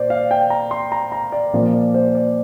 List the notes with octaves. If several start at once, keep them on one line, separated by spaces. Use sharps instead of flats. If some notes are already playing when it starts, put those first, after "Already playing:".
Already playing: A#2 C5 D5
F5
G5
A#5
C6
A#5
A#5
D5
A#2 F3 A#3
D5
C5
D5